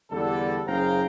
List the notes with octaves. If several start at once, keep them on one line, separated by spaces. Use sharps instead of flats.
E2 D3 G3 A4
F#1 G#4 C5 F5 G5 A#5